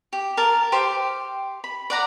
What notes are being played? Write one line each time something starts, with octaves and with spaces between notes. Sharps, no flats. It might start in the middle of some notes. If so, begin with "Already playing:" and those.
G4
A#4 A5
G4 C5 G5
B5
D5 F#5 A#5